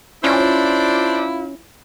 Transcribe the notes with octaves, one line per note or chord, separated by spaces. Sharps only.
C#4 D4 E4 F4 C5 D5